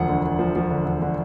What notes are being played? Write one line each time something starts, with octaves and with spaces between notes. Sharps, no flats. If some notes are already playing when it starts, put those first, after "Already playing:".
Already playing: E1 D2 F3 F#5
D3
D3
F3
F3
D3
E1
D3